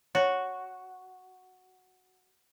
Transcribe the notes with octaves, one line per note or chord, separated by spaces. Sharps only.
F#4 C#5